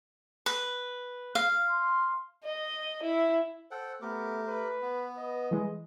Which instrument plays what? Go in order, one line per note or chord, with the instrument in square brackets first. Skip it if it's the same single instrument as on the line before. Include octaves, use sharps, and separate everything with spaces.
[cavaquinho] B4
F5
[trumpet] C6
[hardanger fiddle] D#5
E4
[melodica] A4 F#5 G5 [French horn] C5
[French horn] A3 [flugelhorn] B3 [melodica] G4 A#4 D6
[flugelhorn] B4
[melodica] B3
[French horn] B4 [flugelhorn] D#5
[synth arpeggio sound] E3 G3 G#3